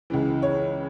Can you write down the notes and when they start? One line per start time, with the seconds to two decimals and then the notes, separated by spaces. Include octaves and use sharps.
0.10 C#2 C#3 E3
0.42 C#5